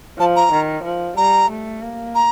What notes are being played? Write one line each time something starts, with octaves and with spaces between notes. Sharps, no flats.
F3 A5
A#5
D#3
F3
G3 A#5
A3
A#3
A#5